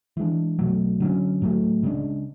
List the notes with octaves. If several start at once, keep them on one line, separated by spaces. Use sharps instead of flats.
E3 G#3 D4
B2 F#3 A3
D3 F#3 C#4
A2 F#3 A3
C#3 G#3 B3 D4